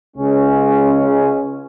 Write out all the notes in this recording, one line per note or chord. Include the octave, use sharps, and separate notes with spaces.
C#2 C#3 G#3 C#4